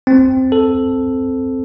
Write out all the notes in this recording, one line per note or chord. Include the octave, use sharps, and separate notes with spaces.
C4
A4